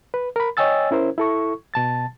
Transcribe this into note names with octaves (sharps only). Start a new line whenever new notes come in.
B4
A#4 B5
C#5 D#5 G5 G#5 E6 A6
C#4 E4 A#4 C5
E4 A4 C#6
B2 A5 A6